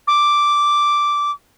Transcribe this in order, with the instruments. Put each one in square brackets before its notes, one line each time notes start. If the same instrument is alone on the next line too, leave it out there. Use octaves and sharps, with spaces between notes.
[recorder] D6